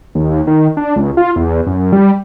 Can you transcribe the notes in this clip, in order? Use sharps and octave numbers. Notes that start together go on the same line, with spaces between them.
D#2
D#3
D4
C#2
F4
E2
F#2
G3